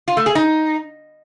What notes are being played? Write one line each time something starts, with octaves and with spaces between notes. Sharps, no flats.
F4
A3
G#4
D#4